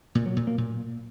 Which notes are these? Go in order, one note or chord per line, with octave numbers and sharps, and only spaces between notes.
A#2
F#3
A#2
A#3
A#2